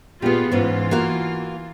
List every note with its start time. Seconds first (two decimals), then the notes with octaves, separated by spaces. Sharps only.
0.22 A#2 B3 F4 G4 G#4
0.52 G#2 E3 B3 C#4 F4
0.91 A#3 F#4 F5